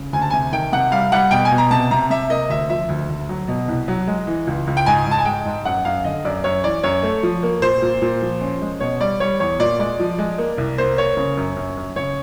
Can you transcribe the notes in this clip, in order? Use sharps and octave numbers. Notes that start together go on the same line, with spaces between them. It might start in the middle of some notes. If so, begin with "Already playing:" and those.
Already playing: C#3
D2 G#5
A5
C3 G#5
D#3 G5
C3 F#5
G3 F5
G3 F#5
B2 G5
G#5
B2
A#5
C3 A5
C3 A#5
C3 E5
A#3 D#5
D2 E5
F3 E5
D2
D2
F#3
B2
C2
F#3
G#3
E3
C#2
C#2
G5
G#2 G#5
G#2
A5
G#5
G#3 G5
G#2
F#2 F#5
F#2 F5
D3 D#5
F#2 D5
F#2 C#5
E3 D5
F#2 C#5
A3
F3
A#3
A#2 C5
A#2
A#2
F3
C#4
G#3
B2 C#5
G3 D5
G3 C#5
E2 C#5
A#2 D5
G#3 D5
F3
G#3
A#3
C2
A#3 C5
A#3 C#5
C#3
F#2
F#2
F#2
C#3 C#5